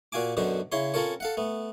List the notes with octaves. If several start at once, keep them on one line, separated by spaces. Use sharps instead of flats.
A#2 F#4 F5 G#5 D6
F#2 B2 D3 F#4 C5
C#3 E4 C#5 C6
C4 C#4 F4 A4 A#4 C#5
A4 F5 F#5
A3 B3